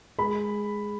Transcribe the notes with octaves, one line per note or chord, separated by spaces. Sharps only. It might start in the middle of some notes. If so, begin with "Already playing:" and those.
G#3 B5